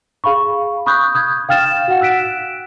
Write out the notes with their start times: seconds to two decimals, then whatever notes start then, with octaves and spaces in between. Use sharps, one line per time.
0.24 G#4 F5 B5 C#6
0.86 B5 C#6 D#6 F#6 G6
1.15 D#6 G6 G#6
1.49 F5 G5 F6 A6 E7
1.88 F#4 F#5
2.01 E6 F#6 B6 D7 E7